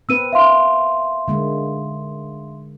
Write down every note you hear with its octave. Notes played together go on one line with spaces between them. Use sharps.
A#3 C4 B4 E6 D#7
E5 F5 C6
D3 G#3 A#3